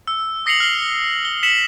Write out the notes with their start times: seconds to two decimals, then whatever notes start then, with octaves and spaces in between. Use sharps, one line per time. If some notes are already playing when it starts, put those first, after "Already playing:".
0.07 E6
0.46 D#6 A#6 C7 C#7 F7 F#7
0.60 F6 C7 G7
1.25 G7
1.43 B6 C#7 E7 F#7